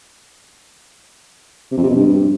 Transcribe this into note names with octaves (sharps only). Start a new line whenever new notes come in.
C3
F2
C3
B2
G2